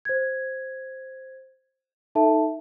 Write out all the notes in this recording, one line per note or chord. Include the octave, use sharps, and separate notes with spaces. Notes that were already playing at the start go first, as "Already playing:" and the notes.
C5 G#6
D#4 A4 E5 A5